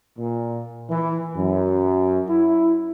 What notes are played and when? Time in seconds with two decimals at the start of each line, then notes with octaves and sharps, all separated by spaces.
0.19 A#2
0.91 E3
1.37 F#2
2.29 E4